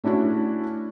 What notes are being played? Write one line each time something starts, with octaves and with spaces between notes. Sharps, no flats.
A3 C#4 D4 E4 F#4